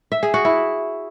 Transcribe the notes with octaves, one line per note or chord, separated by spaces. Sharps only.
E5
G#4
F#4
E4